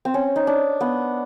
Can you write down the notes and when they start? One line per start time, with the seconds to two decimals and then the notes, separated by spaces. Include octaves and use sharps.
0.05 C4
0.14 C#4
0.36 D#4
0.47 D4
0.81 B3